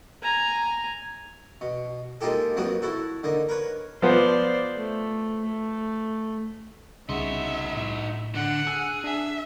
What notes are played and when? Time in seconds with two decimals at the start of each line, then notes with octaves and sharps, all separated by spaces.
0.22 G#5 A#5
1.61 B2
2.21 G#3 A#3 D#4 F4 G4 A4
2.56 F2 F#3 A#3 B3 F#4
2.82 E4 F#4 A4
3.24 D3 A#3 D#4
3.49 A#4 B4 C#5
4.02 F3 B3 C5 D5
4.76 A3
5.45 A3
7.09 C2 C#3 D#4 F#4 E5 C6
7.76 A2
8.35 D3 F#5
8.67 G#4 E6
9.04 D4 E5